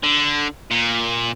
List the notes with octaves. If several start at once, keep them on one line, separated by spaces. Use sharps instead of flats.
D3
A#2